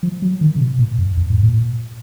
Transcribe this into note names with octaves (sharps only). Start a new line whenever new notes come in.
F3
F#3
D#3
C#3
B2
A#2
F#2
F2
G#2
A#2